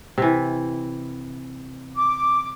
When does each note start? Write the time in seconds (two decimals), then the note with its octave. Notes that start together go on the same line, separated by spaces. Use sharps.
0.18 C3 E3
1.97 D6